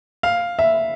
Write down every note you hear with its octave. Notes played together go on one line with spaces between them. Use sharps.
F5
E5